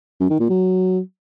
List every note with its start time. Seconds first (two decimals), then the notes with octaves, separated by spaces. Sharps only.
0.20 F#2
0.30 D#3
0.40 A#2
0.50 F#3